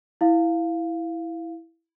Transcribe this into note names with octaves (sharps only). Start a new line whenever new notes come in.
E4 F5